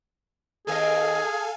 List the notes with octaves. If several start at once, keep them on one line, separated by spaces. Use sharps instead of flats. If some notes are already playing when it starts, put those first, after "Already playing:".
D#2 C4 G#4 A4 D#5 F5 G#5